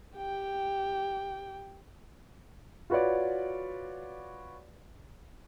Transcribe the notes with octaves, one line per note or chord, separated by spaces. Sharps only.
G4 G5
F4 F#4 B4 C#5 D5